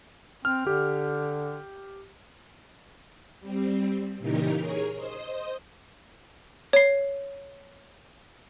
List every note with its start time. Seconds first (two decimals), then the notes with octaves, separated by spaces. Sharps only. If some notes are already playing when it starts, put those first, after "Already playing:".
0.45 C4 F6
0.67 D3 G4
3.40 G3 C4
4.19 A#2 C#3 E3 D#4 G4 A#4
4.59 G#4 A#4 C#5
4.95 C5 D#5
6.73 C#5 C7